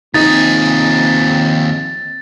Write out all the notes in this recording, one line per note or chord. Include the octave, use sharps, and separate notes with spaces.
D#2 F3 C4 D#4 G#4 A6